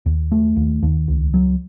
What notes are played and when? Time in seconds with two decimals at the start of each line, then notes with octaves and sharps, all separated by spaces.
0.06 D#2
0.32 A3
0.56 D#2
0.83 D#2
1.08 C#2
1.34 F#3